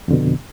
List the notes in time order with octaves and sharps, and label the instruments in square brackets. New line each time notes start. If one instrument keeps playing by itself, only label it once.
[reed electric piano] F2
D3
B2